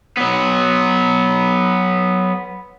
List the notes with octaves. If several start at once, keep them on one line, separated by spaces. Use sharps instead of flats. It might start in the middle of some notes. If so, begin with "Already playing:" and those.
F#3 B3